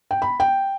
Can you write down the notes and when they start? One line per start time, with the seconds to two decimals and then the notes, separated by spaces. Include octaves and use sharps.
0.11 G5
0.22 B5
0.40 G5